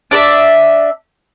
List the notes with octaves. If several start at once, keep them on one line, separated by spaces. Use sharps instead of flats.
D4 D5 E5